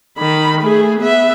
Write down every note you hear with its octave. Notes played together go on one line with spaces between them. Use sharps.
D#3 B5
A3 G#4
B3 E5